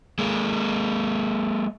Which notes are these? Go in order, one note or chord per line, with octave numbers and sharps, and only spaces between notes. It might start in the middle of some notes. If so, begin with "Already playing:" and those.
G#3 A#3